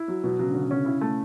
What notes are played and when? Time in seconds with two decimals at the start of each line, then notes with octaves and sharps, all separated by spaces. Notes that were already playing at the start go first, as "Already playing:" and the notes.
Already playing: E4
0.08 F#3
0.24 B2 F#3
0.39 C#3 F#3
0.50 D3 C#4
0.62 C#3
0.71 D3 C#4
0.84 C#3 E4
1.01 A3